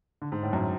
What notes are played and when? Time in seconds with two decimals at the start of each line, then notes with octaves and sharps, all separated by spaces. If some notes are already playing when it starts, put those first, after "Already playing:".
0.22 D3
0.32 G#2
0.43 A2
0.53 F#2